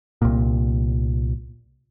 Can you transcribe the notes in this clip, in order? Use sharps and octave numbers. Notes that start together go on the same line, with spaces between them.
C2 A#2